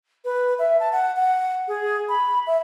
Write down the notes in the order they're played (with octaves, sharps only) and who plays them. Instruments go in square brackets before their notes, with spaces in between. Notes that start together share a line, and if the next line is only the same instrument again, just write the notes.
[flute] B4
E5
A5
F#5
F#5
G#4
B5
E5